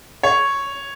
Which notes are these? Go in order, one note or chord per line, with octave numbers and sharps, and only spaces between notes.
C#5